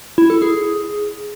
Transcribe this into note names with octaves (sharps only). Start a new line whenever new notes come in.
E4
A4
G#4